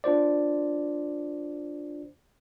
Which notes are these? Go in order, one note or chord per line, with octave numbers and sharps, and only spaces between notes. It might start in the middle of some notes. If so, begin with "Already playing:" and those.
D4 F4 C5 D5